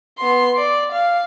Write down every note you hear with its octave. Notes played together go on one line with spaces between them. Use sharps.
B3 C6
D5
F5